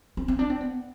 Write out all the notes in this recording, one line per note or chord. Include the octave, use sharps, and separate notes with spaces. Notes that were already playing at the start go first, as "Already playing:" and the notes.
C4
C4
D4
C4
B3